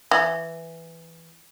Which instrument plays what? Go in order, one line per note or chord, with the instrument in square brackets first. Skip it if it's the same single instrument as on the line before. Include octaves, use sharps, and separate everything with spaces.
[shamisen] E3